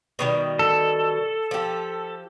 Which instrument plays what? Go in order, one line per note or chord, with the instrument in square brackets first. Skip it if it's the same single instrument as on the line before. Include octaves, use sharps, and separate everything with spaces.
[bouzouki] B2 D#3 G3
[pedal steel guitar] A4
[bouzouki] F3 G4